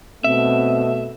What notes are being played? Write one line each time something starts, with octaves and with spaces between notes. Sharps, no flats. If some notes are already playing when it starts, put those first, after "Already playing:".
B2 A3 C4 E5